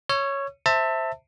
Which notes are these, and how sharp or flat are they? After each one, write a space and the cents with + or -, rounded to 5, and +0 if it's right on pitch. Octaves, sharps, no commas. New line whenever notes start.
C#5 +0 E6 +45
C5 +5 E5 -5 A5 +25